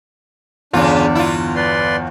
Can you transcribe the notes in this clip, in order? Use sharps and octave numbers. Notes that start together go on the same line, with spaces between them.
G1 E2 C#3 D4 F4
E4 F4
B4 D5 C6